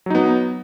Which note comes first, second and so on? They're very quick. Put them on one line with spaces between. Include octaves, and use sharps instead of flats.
F#3 D#4 B3